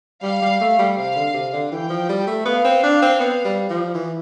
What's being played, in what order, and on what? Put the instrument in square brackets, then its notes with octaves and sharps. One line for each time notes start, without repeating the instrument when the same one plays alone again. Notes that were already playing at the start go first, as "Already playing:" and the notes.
[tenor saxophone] G3 [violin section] F5
[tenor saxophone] G3
A3
G3
[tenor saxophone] C3 [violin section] F5
[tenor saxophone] D3
C3
D3
[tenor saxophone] E3 [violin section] G5
[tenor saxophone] F3
G3
A3
[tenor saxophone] B3 [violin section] F5
[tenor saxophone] C4
D4
C4
B3
G3
F3
E3